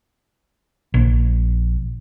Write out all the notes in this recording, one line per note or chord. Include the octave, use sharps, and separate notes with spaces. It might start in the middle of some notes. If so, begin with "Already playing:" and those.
A#1